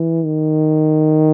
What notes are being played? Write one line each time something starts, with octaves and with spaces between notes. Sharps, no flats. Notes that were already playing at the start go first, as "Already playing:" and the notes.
Already playing: E3
D#3